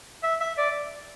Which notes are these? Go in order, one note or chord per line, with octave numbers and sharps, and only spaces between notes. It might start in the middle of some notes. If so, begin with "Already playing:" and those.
E5
E5
D5